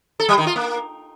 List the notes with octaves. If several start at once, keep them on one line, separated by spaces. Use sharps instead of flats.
A4
G3
D#3
F4
A#3